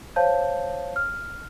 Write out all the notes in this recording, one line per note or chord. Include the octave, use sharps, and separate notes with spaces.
C5 C#5 F5 A5 G6
F6